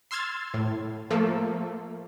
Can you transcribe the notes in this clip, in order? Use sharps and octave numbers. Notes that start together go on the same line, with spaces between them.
C6 E6 F6 G#6 A6
A2
F3 A3 A#3 A4